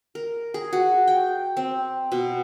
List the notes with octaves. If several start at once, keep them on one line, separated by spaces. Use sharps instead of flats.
A#4
G#4
F#4
G5
C4
B2